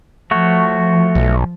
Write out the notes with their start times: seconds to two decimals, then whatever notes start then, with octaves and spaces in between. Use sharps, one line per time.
0.31 F3 A3 F#4 C#5
1.15 B1